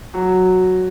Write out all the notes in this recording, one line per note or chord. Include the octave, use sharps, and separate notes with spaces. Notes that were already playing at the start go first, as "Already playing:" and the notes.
F#3